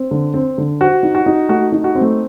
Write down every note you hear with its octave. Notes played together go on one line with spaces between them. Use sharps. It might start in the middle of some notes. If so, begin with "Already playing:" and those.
Already playing: C4
D3
C4
D3
F#4 C5
D#4
F#4
D#4
A3 F#4
D#4
F#4
C4
A3